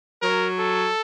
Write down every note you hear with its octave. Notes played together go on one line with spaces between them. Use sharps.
F#3 A#4
A4